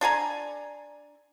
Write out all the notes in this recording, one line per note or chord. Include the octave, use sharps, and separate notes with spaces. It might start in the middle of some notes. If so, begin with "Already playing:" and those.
D4 A4 G#5 A#5